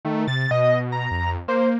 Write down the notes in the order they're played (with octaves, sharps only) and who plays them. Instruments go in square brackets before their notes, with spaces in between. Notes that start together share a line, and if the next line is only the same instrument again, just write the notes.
[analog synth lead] D#3 [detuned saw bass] A3
[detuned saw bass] C3 [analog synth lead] A6
[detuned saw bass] B2 [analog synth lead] D#5
[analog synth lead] A#5
[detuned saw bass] F2
[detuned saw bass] A#3 [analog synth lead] C5